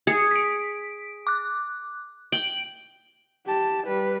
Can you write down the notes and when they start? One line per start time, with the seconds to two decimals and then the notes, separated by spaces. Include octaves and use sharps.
0.07 G#4 G#6 C#7
0.31 B6 D7
1.27 D6 F#6
2.32 G5 D7 F#7
3.46 G4 A5
3.87 G3 B4